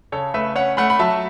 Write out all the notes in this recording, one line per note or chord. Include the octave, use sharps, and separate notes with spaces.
C#3 A4 C#5
A3 B4 E5
C#4 C#5 F#5
A3 F#5 B5
B5
F#3 E5 A5